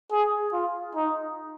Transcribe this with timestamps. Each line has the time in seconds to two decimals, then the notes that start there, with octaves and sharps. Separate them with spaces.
0.11 G#4
0.52 F4
0.95 D#4